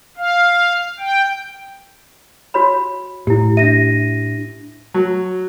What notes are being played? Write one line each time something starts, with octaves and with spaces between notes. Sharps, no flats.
F5
G5
F#4 C#5 B5
A2 E4 G4
D4 E5 A#6 D#7
F#3